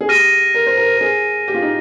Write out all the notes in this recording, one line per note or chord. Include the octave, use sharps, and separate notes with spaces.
G#4
G4 F6 A#6 D#7
A#4
C5
A#4
A#4
G#4
G4
F4
D#4